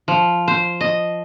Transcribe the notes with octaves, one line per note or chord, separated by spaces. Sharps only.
F3
C5
D#5